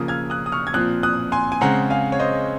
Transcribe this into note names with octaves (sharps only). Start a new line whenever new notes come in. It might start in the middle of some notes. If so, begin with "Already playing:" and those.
Already playing: C#3 F3 A#3 D#6
F6 G#6
D#6 F#6
D#6
C#6 F6
G#6
A#2 F3 C4 D#6 F#6
D#6 F#6
G#5 C6
G#5
C#3 G#3 C4 F#5 A#5
F5 G#5
C#5
C5 D#5